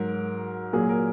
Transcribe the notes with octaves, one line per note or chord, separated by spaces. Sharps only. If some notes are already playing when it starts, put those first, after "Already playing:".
Already playing: G#2 F#3 A#4
A#2 F#3 G#4
A#4